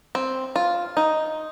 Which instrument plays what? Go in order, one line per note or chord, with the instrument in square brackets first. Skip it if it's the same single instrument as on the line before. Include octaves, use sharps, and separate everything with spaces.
[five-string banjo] C4
F4
D#4